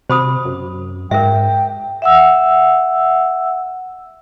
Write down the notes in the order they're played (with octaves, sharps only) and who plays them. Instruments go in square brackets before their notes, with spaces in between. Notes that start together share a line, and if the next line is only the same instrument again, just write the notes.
[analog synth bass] C3 [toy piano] C5 B5 D#6
[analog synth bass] F#2
[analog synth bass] G#2 [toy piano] A#4 E5 [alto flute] G5
[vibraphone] E5 F#5 E6